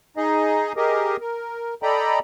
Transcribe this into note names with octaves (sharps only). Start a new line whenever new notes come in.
D#4 G#4 D#5
G4 G#4 A#4 D#5
A#4
A4 D5 D#5 G5 A#5 B5